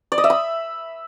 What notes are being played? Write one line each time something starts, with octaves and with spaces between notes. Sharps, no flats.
D5
D#5
E5
B5